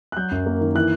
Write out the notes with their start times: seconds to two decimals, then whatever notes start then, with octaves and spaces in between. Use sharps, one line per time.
0.12 F#6
0.17 F#3 G6
0.31 F#2
0.46 A#3
0.61 D#3
0.75 E3 F#6